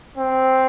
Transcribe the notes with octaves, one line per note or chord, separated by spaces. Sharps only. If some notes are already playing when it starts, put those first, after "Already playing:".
C4